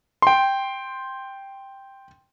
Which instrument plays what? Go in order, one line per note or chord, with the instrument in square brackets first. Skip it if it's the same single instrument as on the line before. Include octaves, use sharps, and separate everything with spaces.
[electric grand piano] G5 C6